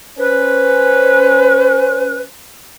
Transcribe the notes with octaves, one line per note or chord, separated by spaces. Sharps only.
C#4 B4 C5